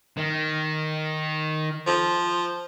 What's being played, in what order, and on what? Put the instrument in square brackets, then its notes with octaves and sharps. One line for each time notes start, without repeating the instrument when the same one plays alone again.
[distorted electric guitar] D#3
[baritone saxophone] F3